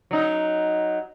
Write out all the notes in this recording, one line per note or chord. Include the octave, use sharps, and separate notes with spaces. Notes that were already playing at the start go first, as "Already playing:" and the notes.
F#3 D#4